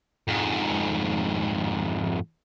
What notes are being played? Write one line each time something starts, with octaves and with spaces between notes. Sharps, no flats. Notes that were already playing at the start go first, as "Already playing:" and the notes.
F2 G#2